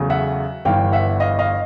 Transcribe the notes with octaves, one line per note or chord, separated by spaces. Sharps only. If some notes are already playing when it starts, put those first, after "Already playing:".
Already playing: E2 C#3 F#3 A3
E5 F#5
G1 G2 E3 F5 G5
E5 F#5
D#5 F5
D#5 F5